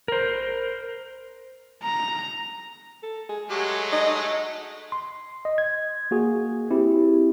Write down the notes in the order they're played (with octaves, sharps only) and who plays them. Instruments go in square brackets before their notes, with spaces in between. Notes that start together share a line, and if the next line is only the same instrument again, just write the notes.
[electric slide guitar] A#4 C5
[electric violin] A#5
[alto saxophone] A4
G#4
[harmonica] F#3 G#3 A3 [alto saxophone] G4
[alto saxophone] D#5
[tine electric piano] C6
D#5
G#6
A#3 F#4 G#4
C4 E4 G4